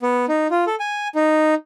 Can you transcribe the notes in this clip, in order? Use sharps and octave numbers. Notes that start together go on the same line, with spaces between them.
B3
D#4
F4
A4
G#5
D#4